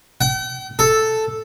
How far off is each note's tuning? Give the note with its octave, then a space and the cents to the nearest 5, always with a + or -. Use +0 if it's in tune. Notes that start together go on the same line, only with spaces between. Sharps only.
G5 -45
A4 +0